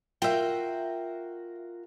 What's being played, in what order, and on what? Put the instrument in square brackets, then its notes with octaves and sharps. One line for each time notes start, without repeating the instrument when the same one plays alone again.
[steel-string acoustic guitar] F4 F#4 A#4 [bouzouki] E5 G5